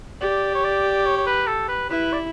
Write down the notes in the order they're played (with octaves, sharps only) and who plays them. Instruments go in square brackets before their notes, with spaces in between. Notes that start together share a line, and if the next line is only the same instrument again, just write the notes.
[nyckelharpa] G4 [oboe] D5
[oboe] C#5
D5
C#5
C#5
B4
A4
B4
[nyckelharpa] E4 [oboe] B4
[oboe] D5